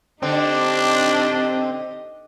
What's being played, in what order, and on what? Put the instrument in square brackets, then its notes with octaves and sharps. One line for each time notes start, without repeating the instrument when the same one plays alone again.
[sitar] D3 [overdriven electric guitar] C4 [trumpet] D4 [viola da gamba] D#4 G4 D#5